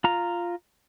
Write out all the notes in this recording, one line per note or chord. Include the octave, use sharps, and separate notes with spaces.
F4 A#5